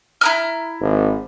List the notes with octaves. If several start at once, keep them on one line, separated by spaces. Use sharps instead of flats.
E4 A#5 F6
G#1